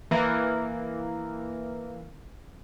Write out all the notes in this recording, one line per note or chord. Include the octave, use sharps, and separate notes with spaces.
E3 A#3